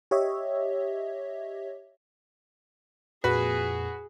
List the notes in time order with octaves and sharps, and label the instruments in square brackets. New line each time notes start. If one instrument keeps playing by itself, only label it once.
[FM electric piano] G4 C#5 D#5 E5
[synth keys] F2 A#2 [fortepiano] F#4 B4 [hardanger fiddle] G#4